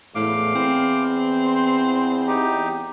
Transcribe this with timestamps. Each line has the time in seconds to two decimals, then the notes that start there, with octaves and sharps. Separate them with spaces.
0.15 E2 A2 F5 D6
0.55 C4
1.46 C6
2.27 D#4 G4